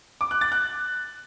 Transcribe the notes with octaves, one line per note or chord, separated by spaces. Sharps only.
D6
F#6
A6
F#6